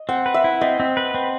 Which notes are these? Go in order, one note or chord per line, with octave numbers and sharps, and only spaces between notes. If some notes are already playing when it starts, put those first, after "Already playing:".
Already playing: D#5
C4 F#5
B4
E5
E4
C4 D#5
C4
B4
C4